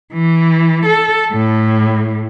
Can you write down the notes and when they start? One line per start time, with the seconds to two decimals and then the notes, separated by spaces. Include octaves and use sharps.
0.13 E3
0.85 A4
1.33 A2